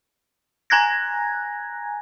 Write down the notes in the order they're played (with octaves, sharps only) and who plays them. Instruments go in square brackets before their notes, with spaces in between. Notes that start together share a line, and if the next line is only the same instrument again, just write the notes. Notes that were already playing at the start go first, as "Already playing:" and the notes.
[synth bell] G#5 A#5 F#6 G#6 A#6